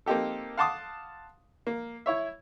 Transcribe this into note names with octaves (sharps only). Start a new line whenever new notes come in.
A#3 C4 D#4 G4 A4
F5 F#5 A5 C6 D6 D#6
A#3
E4 C#5 E5